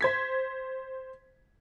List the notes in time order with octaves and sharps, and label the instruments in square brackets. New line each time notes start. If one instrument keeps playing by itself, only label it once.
[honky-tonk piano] C5 G#6 B6